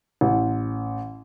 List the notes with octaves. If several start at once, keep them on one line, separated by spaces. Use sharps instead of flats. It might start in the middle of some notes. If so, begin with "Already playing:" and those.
A1